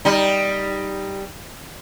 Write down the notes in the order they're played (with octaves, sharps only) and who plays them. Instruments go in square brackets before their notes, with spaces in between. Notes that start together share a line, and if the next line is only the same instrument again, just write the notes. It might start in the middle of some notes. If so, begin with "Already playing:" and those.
[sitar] G3 D#4